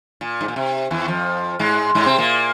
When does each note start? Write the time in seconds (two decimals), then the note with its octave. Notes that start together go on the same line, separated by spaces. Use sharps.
0.21 A#2
0.41 G#2
0.48 A#2
0.56 C3
0.91 E2 E3
1.08 F2 F3
1.59 G#2 G#3
1.95 G#2 G#3
2.06 C3 C4
2.18 A#2 A#3